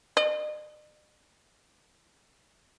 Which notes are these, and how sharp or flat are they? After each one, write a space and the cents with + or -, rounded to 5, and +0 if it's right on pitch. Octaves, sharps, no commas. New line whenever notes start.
D#5 -45